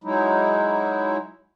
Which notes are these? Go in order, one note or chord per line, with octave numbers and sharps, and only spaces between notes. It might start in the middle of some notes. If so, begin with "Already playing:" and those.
F#3 G#3 D#4 E4